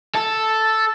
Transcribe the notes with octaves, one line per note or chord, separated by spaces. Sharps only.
A4